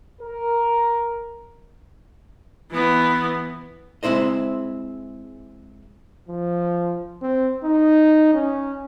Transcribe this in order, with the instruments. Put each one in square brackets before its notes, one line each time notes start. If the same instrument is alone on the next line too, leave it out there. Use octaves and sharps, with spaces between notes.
[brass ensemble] A#4
[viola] E3 B3
[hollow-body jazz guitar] G#3 C4 E4 C5 D#5
[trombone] F3
C4
D#4
C#4